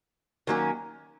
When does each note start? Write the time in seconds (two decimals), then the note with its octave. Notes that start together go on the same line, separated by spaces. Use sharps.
0.47 D#3 F#3 A#3 C#4